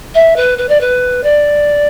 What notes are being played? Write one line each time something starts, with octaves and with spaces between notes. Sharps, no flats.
E5
B4
B4
D5
B4
D5